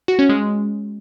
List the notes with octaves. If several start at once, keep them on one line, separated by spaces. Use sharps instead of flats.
F#4
C#4
G#3